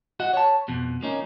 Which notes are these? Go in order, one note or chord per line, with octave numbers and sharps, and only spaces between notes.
F#4 D#5 F#5
C#5 A5
F2 B2
F3 A#3 C#4 D#4